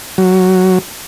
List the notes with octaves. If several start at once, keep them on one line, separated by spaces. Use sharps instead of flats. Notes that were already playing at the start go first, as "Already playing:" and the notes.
F#3